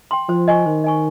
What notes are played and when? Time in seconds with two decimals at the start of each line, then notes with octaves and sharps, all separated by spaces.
0.11 G5 C6
0.29 F3 C5
0.48 D#5 G#5 C#6
0.66 D#3 C5
0.84 D#5 G#5 C#6